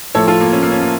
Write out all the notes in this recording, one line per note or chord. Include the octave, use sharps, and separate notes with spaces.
A2 F3 A4 C#5
F4 A4
A#3
C#4
A#3
C#4
A#3